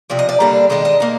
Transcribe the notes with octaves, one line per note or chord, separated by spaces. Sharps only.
C3 F3 D5
D#5
D5
D3 G3 A#3 D4
D#3 G#3 D4 D#5
D#5
A#3 D#4